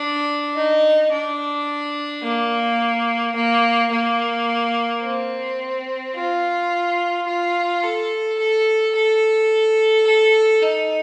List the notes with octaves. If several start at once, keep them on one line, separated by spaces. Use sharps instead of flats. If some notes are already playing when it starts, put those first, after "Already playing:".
Already playing: D4
D#4
D4
A#3
A#3
A#3
C4
F4
F4
A4
A4
A4
A4
D#4